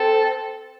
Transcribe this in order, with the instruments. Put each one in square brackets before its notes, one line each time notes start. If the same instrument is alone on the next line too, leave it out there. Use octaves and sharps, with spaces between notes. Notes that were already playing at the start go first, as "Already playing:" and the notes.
Already playing: [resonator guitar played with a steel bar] C4 [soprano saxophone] A4